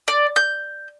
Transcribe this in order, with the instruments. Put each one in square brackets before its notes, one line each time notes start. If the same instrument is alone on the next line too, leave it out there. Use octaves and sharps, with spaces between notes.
[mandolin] D5
G6